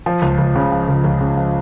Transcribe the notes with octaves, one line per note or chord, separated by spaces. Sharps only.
F3
C#2
C#2
C#3
F3
C#2
C#2
C#3
F3